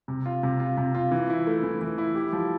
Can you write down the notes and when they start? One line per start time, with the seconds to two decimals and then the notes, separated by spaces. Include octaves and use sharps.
0.08 C3
0.26 F4
0.43 C3
0.60 F4
0.77 C3
0.95 F4
1.11 E3
1.30 E4
1.47 A3
1.63 E3
1.81 E3
1.98 E4
2.15 G4
2.33 F3